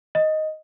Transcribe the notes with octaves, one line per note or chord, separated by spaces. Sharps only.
D#5